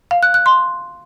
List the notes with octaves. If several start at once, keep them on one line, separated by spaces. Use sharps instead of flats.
F5
F#6
F#6
C6